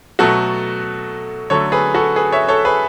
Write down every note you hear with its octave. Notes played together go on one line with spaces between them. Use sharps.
B2 F#3 A3 F#4 A4
D3 F#3 A3 A4 C#5
G#4 B4
F#4 A4
G#4 B4
C#5 E5
A4 C#5
G#4 B4